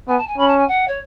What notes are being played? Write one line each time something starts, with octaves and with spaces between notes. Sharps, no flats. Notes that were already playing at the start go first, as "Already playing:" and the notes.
B3 G#5
A5
G#5
C#4 B5
A5
G#5
F#5
C#5